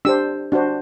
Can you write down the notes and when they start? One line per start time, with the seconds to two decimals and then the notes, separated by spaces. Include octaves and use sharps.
0.05 D4 G4 C5 E6
0.52 D4 F#4 C5